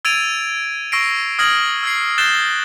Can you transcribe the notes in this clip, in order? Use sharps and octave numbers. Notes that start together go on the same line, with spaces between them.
E6 G#6 A6 D7 D#7 F7
C#6 E6 A#6 C7 D7
D#6 F6 G#6 A#6 F#7
E6 G#6 C7
F#6 G6 A6 C7 E7 G7